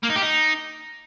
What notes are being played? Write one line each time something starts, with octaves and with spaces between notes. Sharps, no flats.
A#3
D#4
G4
D#4